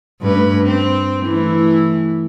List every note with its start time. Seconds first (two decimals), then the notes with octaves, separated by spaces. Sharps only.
0.21 G2 A3 B4
0.63 C4
1.23 E3 A3 E4